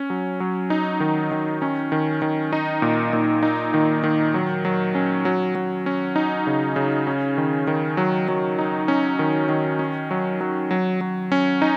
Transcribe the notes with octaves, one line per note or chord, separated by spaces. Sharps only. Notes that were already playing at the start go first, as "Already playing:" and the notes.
Already playing: C#4
F#3
F#3
D#4
D#3
D#3
C#4
D#3
D#3
D#4
A#2
A#2
D#4
D#3
D#3
F#3
F#3
C#4
F#3
F#3
C#4
D#4
C#3
C#3
C#4
D#3
D#3
F#3
F#3
D#4
C#4
D#3
D#3
C#4
F#3
F#3
F#3
F#3
C#4
D#4